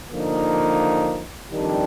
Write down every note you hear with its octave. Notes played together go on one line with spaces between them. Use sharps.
D3 F3 A#3 D#4
F2 D#3 G3 D4